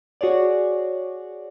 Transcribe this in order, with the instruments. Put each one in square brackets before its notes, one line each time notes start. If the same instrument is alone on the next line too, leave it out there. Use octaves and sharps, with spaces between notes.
[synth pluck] F#4 G#4 C#5 D5